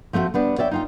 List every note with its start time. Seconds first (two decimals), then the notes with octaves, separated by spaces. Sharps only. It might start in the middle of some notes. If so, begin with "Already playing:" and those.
0.13 F3 A3 C4 D#4 F#4
0.34 G3 B3 D4
0.58 C#5 D5 E5 G5
0.71 D#4 F4 G5